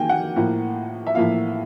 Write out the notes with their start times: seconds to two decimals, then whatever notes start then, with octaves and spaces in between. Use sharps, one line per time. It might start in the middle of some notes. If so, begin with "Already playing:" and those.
Already playing: D#3 A#3 G5 G#5
0.09 F#5
0.36 A2 F3 A#3
1.06 E5
1.15 A2 F3 A#3 F5